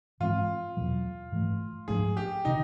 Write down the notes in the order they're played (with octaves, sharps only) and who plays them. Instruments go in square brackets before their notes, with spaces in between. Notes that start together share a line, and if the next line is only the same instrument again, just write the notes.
[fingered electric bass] G#2 E3 G#3 C4 [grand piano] F4
[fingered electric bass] E2 B2 F#3
G#2 E3 A3
[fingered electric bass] G#2 F3 A3 D4 [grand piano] G#4
[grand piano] G4
[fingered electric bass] C3 D#3 [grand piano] D#4